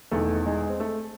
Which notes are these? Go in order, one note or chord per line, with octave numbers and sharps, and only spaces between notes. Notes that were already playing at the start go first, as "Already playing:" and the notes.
E1 E2 D#3 A3
G#3
C4
A3